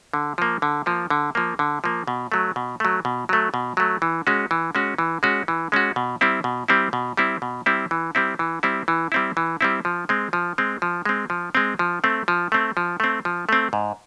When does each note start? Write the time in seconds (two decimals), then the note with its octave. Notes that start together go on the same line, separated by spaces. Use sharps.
0.14 D3
0.38 F3 A#3
0.62 D3
0.86 F3 A#3
1.10 D3
1.35 F3 A#3
1.59 D3
1.84 F3 A#3
2.08 B2
2.32 F#3 A3
2.56 B2
2.80 F#3 A3
3.05 B2
3.29 F#3 A3
3.54 B2
3.77 F#3 A3
4.02 E3
4.27 G#3 C#4 F#4
4.51 E3
4.75 G#3 C#4 F#4
4.98 E3
5.23 G#3 C#4 F#4
5.48 E3
5.72 G#3 C#4 F#4
5.96 B2
6.21 G3 C4 E4
6.44 B2
6.68 G3 C4 E4
6.93 B2
7.17 G3 C4 E4
7.42 B2
7.66 G3 C4 E4
7.91 E3
8.15 G3 C4 E4
8.39 E3
8.63 G3 C4 E4
8.88 E3
9.12 G3 C4 E4
9.37 E3
9.61 G3 C4 E4
9.85 F3
10.09 G#3 C4
10.33 F3
10.58 G#3 C4
10.82 F3
11.05 G#3 C4
11.30 F3
11.55 G#3 C4
11.79 F3
12.04 A3 C4
12.28 F3
12.52 A3 C4
12.77 F3
13.00 A3 C4
13.25 F3
13.49 A3 C4
13.73 G#2